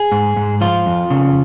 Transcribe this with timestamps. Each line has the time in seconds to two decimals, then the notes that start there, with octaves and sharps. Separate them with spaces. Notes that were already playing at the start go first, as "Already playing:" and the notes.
Already playing: G#4
0.12 G#2
0.37 G#2
0.61 F3 F4
0.86 F2
1.10 C#3